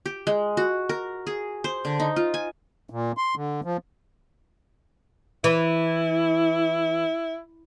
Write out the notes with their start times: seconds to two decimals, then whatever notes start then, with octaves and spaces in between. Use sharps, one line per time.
0.06 G4
0.27 G#3
0.57 F#4
0.89 A#4
1.27 G#4
1.64 C5
1.85 D3
2.00 D#4
2.16 F4
2.34 G#5
2.90 A#2
3.17 C6
3.36 D3
3.64 F3
5.44 E3 E4